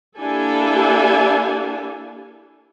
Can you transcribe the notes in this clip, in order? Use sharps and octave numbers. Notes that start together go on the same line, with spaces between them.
A#3 D4 E4 G4 A4 G#5